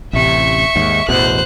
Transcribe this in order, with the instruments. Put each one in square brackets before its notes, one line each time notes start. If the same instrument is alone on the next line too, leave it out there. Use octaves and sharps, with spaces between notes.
[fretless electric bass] A1 C3 [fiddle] E5 C#6
[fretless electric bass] D#2 G#2
[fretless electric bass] A1 E2 B2 [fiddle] C5 F#6